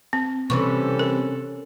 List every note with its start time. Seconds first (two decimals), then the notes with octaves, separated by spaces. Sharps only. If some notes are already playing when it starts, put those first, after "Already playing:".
0.13 C4
0.50 C3 E3 G3 C#4 A4 C#6
0.99 A#4